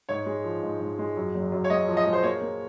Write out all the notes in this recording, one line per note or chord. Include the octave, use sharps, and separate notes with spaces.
G#2 C#5
G#3
F3
G#2
G#2
G#3
F#2
F#1
F#2
C#5
G#3 D#5
F3
D#5
G#3
C5
A#3 C#5
A#3